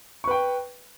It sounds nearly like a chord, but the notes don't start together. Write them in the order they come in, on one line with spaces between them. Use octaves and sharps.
C#6 B4 G5